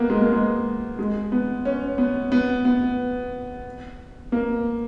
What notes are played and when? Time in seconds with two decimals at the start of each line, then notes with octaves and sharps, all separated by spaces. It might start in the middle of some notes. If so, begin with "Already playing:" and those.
Already playing: A#3 B3
0.10 G#3
0.21 A#3
0.32 G#3
0.99 G#3
1.32 B3
1.65 C#4
1.98 B3
2.32 B3
2.65 B3
4.32 A#3